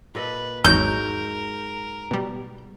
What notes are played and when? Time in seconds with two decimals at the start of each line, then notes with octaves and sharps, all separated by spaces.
0.15 A#2 A4 B4 D#5
0.65 G#1 E2 G#2 F#3 F#4 A#4 G6
2.11 B2 G3